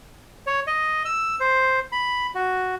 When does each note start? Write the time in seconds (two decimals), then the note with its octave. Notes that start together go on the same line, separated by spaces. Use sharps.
0.47 C#5
0.67 D#5
1.05 E6
1.40 C5
1.92 B5
2.35 F#4